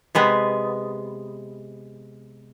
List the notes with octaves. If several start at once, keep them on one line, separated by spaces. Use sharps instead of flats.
C3 G#3 B3